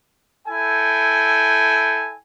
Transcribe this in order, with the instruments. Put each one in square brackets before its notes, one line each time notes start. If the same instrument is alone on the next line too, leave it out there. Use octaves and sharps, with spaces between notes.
[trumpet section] E4 A4 G5 G#5